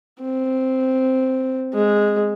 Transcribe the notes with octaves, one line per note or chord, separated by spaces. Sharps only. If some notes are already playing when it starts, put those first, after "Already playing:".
C4
G#3